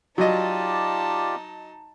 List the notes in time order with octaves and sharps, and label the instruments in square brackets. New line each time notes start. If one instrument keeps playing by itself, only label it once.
[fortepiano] F#3 D#5 [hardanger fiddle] D#4 A5 [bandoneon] F4 G4 D5